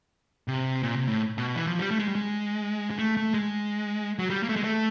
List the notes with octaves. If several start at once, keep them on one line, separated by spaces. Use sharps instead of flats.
C3
A#2
C3
A2
B2
E3
F3
G3
A3
G#3
G3
G#3
G#3
A3
A3
G#3
F#3
G3
A#3
A3
G#3
A3